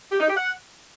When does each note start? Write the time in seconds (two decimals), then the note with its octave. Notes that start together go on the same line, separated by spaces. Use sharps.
0.12 G4
0.20 D#4
0.28 G4
0.37 F#5